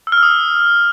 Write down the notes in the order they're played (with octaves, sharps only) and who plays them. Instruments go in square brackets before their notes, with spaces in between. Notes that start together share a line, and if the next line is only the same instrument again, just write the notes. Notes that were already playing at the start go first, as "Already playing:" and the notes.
[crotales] E6
F6
E6
D#6